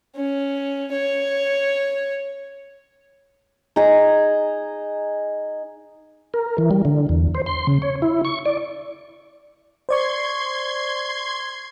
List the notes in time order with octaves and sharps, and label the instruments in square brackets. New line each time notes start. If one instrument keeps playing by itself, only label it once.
[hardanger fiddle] C#4
C#5
[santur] D#4 G#4 A#5
[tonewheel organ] A#4
E3
G3
D3
E2
C5
C6
C#3
C#5
E4
C#6
D5
[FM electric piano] C5 D5 C#6 [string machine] C6 G#6